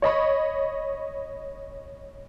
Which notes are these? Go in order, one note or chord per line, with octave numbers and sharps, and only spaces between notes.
C#5 D#5 B5 C#6